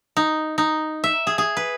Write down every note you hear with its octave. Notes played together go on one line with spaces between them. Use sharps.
D#4
D#4
E5
G#4
G#4
B4